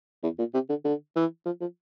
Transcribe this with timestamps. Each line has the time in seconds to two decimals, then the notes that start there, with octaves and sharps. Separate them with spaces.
0.24 E2
0.39 A#2
0.54 C3
0.69 D3
0.85 D3
1.16 E3
1.46 F3
1.61 F3